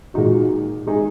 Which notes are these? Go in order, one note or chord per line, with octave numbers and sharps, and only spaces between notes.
A#2 G#3 D#4 F#4
G#3 D#4 G#4